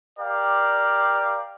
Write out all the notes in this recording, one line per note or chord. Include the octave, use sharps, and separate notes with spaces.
G4 A#4 D5 F5